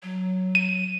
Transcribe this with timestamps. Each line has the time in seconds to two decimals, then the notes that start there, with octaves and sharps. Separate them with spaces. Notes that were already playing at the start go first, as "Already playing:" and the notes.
0.03 F#3
0.55 D#7